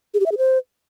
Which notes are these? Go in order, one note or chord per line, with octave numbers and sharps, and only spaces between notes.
G#4
G4
E5
G#4
C5